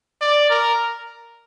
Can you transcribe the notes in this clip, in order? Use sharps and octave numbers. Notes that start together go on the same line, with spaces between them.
D5
A#4